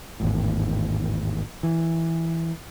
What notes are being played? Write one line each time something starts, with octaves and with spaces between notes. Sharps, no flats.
G#1 E2 A2
E3